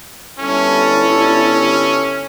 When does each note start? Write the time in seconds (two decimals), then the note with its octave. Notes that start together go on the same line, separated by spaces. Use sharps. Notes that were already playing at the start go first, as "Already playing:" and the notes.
0.39 G1 C#4 E4 A4